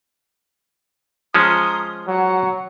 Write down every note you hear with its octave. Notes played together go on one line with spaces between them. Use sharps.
F3 G#3 C#4 A#5 C6 D#6
F#3 F#5